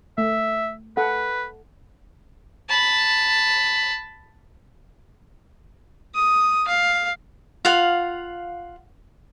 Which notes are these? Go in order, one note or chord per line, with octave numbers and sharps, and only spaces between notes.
A3 E5
A4 B4 F#5
A5 B5
D#6
F5
F4 F5 F#5